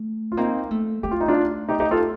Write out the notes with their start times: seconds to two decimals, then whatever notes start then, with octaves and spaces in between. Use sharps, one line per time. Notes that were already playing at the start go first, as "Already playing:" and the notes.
Already playing: A3
0.32 F4
0.37 A#3 C4 D#4
0.71 A3
1.03 A3 G4
1.11 F4
1.21 D#4
1.28 D4 F4
1.69 D#4 G4
1.80 D#4 G4
1.91 F4 A4